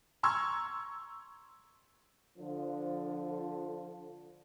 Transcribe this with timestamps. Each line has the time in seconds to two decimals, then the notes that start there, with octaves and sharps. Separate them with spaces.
0.23 A#5 C6 C#6 E6 G#6
2.38 D3 F3